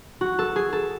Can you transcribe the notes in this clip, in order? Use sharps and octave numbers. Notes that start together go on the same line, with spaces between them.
F#4
A4
G#4
A4